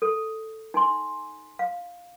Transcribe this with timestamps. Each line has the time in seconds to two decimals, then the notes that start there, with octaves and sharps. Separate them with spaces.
0.02 A4
0.74 D#4 G#5 C6
1.59 F5